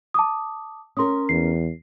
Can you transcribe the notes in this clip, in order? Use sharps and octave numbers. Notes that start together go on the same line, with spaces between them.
A5 D6 D#6
C#4 A#4 C6 D#6
E2 C7